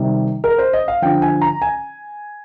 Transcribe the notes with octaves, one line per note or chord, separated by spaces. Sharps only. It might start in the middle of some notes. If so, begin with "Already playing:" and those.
Already playing: C3 D#3 G3
A#4
C5
D#5
F5
D3 F3 G5
G#5
A#5
G#5